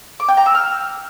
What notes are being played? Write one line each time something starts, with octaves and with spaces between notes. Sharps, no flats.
D6
G5
A#5
E6
F6